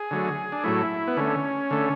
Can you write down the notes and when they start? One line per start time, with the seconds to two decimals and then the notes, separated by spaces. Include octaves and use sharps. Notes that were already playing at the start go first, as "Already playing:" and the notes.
Already playing: G#4
0.11 D3 F#3 A3
0.52 D4
0.64 A2 F#3 A3 E4
1.07 B3
1.17 D3 A3 C#4
1.71 D3 A3